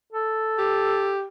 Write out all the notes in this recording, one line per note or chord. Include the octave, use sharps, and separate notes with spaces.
A4
G4